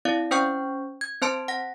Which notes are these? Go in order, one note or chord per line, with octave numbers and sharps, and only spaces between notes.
C4 E4 D5 F5
C#4 C5 G5 C#6 G6
G#6
C4 C5 A5 C6 D7
F#5 A#6